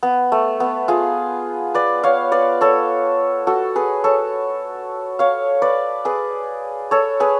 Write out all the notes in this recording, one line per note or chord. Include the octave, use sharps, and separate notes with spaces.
B3
A3
B3
F4 G#4
B4 D5
C#5 F5
B4 D5
A4 C#5
F#4 A4
G#4 B4
A4 C#5
C#5 F5
B4 D5
G#4 B4
A4 C#5
G#4 B4